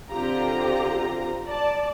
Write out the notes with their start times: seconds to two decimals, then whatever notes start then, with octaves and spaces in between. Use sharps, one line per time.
0.10 D3 C4 F4 G4 A#5
1.47 D5 A5